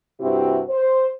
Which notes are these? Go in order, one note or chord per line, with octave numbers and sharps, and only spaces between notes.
G2 C3 C4 E4 F#4 G4
C5